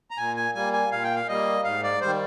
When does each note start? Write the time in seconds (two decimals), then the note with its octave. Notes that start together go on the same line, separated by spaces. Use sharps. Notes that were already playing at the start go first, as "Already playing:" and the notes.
0.11 A#5
0.18 A#2 G#5
0.37 G#5
0.55 G3 A#3 G#5
0.73 G#5
0.92 A#2 F5
1.03 G5
1.15 F5
1.28 G3 A#3 D#5
1.64 G#2 F5
1.83 D5
2.01 D#3 G3 C5